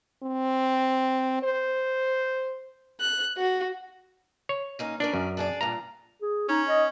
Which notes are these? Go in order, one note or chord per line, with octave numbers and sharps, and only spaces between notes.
C4
C5
F#6
F#4
C#5
A#3 C#4 D#4
C#4 D4 A#4 D5
F#2
D4 G#4 D5
G2 A#2 A#5
G#4
C#4 D#4
D#5